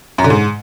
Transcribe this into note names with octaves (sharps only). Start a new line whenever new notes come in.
F#2
D3
G#2